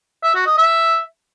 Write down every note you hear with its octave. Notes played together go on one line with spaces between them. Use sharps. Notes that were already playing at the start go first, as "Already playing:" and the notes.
E5
F#4
D#5
E5